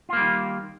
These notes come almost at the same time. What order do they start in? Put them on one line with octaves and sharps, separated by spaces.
F4 A#3 G3 D#3